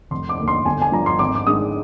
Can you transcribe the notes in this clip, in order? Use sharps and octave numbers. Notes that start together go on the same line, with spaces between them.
F1 C6
D6
D#2 D3
C6
G1 G#5
G#5
G2 F3 A#5
C6
G#1 D6
D6
G#2 D#3 G#3 D4 D#6